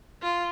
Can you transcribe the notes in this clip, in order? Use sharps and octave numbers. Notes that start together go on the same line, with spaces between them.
F4